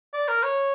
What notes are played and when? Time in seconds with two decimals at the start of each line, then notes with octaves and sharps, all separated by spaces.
0.14 D5
0.28 A#4
0.43 C#5